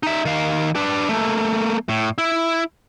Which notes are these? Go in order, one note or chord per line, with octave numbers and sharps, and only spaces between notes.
D#4 E5
D#3 F5
D4 B4
A3 A#3
A2
E4